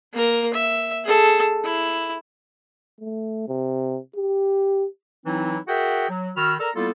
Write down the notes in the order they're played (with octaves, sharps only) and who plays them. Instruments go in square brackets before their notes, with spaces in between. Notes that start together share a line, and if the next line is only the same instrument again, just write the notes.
[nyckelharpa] A#3 A#4
E5
G#4 A4
E4
[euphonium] A3
C3
G4
[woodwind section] E3 F#3 C4 D#4 E4
F#4 G#4 A#4 E5 F#5 G5
F#3
D#3 F#4 B5 E6 F6
A4 A#4 D5 A#5
G3 A#3 B3 E4 F4 A4